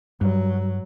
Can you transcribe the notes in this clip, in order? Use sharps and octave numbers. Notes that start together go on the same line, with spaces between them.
G2 F#3